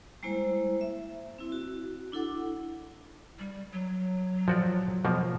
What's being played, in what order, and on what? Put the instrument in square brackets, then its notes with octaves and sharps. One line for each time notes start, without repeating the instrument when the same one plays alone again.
[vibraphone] G3 G#3 A#3 E4 C5
E5
C4 E4
F#4
D4 E4 A4 F#5 D6
[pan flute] G3
F#3
[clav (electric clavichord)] F3 F#4 D5
B2 F3 A#3